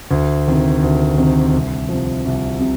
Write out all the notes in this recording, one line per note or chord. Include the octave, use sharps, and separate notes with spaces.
D2
C3 D#3
D2
C3 D#3
C2
C3 F3
C2
C3